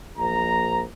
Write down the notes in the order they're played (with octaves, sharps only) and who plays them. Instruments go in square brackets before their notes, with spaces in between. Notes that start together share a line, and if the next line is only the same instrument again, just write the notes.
[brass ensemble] A#1 A#5